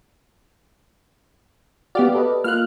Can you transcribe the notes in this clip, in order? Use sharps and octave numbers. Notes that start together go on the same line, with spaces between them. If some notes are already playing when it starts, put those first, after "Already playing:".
B3 F#4 G4 D5 F5 F6
A4 B4 D#5
A#3 F4 F5 F6 F#6